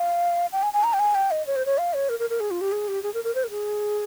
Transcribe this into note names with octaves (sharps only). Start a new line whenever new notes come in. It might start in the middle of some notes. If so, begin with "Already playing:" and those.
Already playing: F5
G5
G#5
G#5
A#5
G5
G#5
G5
D#5
C#5
C5
C#5
F5
C#5
A#4
A#4
A#4
G#4
F4
G4
G#4
G4
G#4
A#4
A#4
C5
A#4
G#4